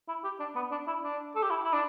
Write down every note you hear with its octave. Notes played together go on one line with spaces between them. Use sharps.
E4
G4
D4
B3
D4
E4
D4
A4
G4
E4
E4
D4